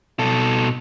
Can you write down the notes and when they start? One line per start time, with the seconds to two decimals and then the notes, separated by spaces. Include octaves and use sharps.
0.19 B2 A4